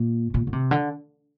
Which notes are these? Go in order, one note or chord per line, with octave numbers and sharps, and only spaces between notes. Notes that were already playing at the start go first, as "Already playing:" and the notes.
Already playing: A#2
A#2
D3
C3
D3